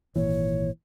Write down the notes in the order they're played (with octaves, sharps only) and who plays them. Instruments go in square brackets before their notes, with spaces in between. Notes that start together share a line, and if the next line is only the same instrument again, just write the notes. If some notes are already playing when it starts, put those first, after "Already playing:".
[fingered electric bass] G#1 A#2 E3 [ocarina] C#5